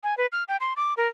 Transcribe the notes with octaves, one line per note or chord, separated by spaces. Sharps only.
G#5
B4
F6
G5
C6
D6
A#4